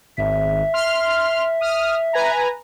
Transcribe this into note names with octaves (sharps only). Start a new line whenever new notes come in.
G#1 E5
C6 F6
D#6 F6
B4 G#5 A#5